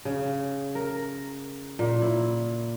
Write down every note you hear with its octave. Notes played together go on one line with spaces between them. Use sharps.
C#3
A#4
A#2
E4